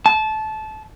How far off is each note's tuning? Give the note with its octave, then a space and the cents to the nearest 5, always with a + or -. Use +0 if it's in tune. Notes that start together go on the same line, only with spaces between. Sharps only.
A5 -20